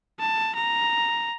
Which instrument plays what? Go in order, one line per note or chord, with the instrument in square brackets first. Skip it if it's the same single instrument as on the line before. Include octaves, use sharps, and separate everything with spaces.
[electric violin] A5
A#5